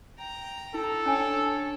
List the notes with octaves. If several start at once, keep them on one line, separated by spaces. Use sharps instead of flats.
G5 A#5
E4 A4
C#4 D4 C#5 G#5